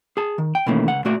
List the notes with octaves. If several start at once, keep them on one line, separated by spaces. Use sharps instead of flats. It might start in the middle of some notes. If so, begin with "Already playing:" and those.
G#4 A5
D#3
G5
B2 D#3 E3 A3 A#3 C#4
C#2 F#5
A#2 A3 F#4 D5